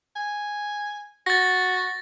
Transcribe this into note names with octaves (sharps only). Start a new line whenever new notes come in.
G#5
F#4 A6 A#6